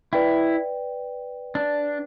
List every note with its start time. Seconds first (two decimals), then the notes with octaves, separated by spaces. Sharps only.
0.13 E4 B4 D5 G5
1.55 D4